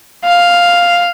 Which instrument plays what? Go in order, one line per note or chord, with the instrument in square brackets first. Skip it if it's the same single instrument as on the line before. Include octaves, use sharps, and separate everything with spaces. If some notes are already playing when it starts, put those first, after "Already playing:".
[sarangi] F5